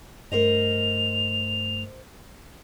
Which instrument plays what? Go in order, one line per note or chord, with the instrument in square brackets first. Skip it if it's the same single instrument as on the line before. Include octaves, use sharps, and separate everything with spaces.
[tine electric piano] G2 A3 [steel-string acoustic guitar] A#4 C5 D#5 [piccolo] F7